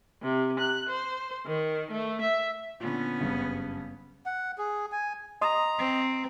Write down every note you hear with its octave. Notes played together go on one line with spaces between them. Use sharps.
C3
F#6
C5
D#3
A3
E5
A#2 D3 B3 C#4
F#1 G2 C#3
F#5
G#4
G#5
D#5 A#5 C6 D#6
C4